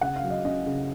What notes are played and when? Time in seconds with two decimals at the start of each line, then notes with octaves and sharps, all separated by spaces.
0.01 C#3 F#5
0.16 F5
0.23 F#3
0.30 D#5
0.44 C#4 D#5
0.66 C#3